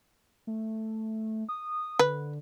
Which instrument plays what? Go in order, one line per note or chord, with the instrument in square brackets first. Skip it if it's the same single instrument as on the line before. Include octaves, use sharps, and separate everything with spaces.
[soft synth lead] A3
D#6
[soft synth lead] D3 [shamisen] B4